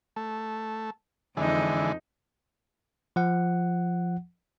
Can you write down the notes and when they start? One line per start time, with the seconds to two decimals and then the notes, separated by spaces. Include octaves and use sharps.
0.16 A3
1.37 F2 D3 E3 G#3 D#4
3.16 F3 F#5